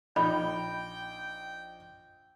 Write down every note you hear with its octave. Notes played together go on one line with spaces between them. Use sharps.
A#1 D#4 G5 B5 G6